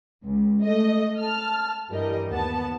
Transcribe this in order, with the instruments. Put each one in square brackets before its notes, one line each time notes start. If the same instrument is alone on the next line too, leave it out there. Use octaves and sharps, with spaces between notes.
[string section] C#2
A3 D#5
A5 F6
G2 E3 G3 A#4 D#5
D#2 B3 A5